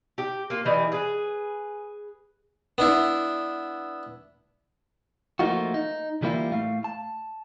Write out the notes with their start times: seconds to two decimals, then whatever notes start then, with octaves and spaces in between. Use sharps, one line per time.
0.18 G4
0.50 A#3 F4
0.66 E3 G3 D#5
0.92 G#4 B4
2.78 B3 D4 E4
5.39 F3 A3 A#3 D#4 F4 F#4
5.74 D#4
6.22 E3 G3 A#3 E4 F4
6.52 A2 A3 F5
6.84 A5